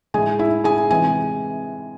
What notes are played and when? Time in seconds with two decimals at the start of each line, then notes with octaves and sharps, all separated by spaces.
0.14 A2 G#3 G#4 G#5
0.39 E4 E5
0.64 G#4 G#5
0.91 C3 E3 G#3 G#5